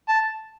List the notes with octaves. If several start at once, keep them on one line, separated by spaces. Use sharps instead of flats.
A5